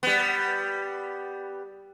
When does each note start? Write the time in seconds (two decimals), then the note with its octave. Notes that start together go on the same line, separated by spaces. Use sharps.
0.03 G3 B3